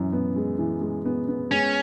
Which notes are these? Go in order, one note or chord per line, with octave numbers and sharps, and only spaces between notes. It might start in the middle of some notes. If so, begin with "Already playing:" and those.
Already playing: F#2 E3
B3
G#3
E3
G#3
B3
B3
G#3 C#4